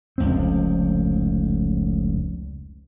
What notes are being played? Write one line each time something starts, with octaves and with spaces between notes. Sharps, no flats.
F1 C#2 C4